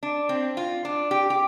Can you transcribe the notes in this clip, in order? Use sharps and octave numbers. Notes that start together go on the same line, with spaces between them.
D4
C4
F4
D4
G4
G4